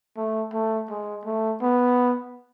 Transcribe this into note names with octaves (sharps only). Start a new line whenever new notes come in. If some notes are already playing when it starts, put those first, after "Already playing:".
A3
A3
G#3
A3
B3